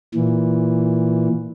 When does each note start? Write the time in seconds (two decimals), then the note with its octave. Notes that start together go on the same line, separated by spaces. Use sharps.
0.14 A#2 E3